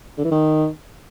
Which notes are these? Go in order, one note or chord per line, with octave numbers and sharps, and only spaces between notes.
D3
E3
D#3